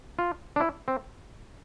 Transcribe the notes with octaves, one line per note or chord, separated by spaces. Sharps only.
F4
D4
E4
C4